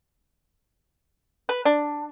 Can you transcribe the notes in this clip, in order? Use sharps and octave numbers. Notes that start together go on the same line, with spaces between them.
B4
D4